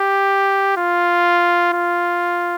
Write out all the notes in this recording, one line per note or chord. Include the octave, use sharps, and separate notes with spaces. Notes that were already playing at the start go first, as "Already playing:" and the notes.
Already playing: G4
F4
F4